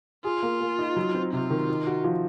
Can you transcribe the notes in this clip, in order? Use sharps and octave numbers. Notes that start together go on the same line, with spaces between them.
F4 G#4
A#3
A#3
D#4
F#3
C4
C3 F4
D#3
D#4
F#4
F3